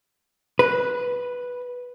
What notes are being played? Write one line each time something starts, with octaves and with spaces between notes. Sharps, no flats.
B4